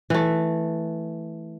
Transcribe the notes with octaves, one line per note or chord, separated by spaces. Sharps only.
E3 A3